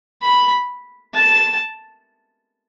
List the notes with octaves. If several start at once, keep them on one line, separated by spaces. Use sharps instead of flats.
B5
A5